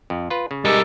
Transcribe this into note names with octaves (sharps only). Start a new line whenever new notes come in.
F2
F4 B4
C#3
G3 G#3 D#4 G4 A4 A#4